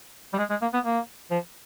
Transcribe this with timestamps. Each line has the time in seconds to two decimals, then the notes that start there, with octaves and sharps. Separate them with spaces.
0.33 G3
0.38 G#3
0.50 G#3
0.62 A#3
0.73 B3
0.85 A#3
1.31 F3